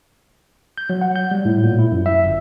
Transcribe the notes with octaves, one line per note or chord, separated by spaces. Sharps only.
G6
F#3
F#5
G6
G3
A2
A#2
E4
F#2
E5
G1